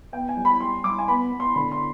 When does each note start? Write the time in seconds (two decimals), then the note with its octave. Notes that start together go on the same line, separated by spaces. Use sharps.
0.13 B3 G5
0.29 G#5
0.37 G3
0.45 B5
0.60 G3 C6
0.84 G2 D6
0.99 G#5
1.08 B3 B5
1.31 B3
1.40 C6
1.55 D3 B5
1.72 C6